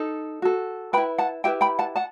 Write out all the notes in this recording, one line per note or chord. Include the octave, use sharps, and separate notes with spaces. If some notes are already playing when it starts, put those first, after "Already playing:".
Already playing: D#4 A4
F#4 A4
E4 B4 G5 B5
F#5 A5
E4 G4 B4 E5 G5
G5 B5
F#5 A5
F#5 A5